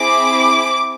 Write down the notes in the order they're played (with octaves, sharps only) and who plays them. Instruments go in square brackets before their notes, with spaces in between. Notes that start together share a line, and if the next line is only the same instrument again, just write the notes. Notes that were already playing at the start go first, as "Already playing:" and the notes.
Already playing: [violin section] C4 E4 G#4 D6